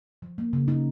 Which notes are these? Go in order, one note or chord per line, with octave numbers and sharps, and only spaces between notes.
F3
A#3
C#3
D#4